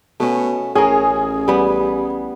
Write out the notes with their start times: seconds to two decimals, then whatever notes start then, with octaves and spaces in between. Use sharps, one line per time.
0.20 B2 A3 C#4
0.75 A1 C#4 G#4 A#4
1.48 G3 B3